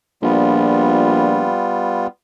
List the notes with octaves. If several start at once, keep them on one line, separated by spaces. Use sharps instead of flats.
A#1 G3 B3 F4